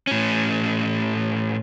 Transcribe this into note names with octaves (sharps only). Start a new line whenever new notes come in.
A2 C#4